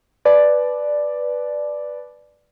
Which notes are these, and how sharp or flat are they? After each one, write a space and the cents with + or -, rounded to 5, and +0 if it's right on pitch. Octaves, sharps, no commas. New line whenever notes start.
B4 +0 D5 +5 A5 -40